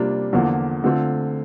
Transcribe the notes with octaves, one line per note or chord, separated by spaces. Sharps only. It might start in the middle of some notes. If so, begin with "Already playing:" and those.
Already playing: C3 G3 A#3 D4 F4
E2 D3 F3 A#3 F4
D3 A3 C4 F4